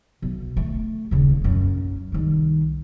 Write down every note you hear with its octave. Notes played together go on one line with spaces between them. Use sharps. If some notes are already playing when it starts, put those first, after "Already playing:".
B1
A3
D#1 C#3
A#1 F#2
C2 D#3